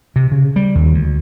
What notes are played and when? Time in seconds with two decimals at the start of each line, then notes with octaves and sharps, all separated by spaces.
0.16 C3
0.32 C#3
0.56 G3
0.75 D#2
0.94 D2